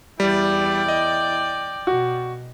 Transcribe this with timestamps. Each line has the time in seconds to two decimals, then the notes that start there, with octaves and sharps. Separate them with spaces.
0.20 E2 G3 E4 D5 G5
0.88 D#5
1.87 B2 F#4